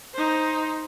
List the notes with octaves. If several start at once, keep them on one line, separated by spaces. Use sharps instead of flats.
D#4 C5